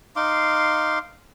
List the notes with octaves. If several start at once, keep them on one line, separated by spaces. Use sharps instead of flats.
D#4 F5 C6 D6